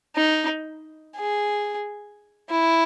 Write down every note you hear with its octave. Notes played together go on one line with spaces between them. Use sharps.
D#4
G#4
E4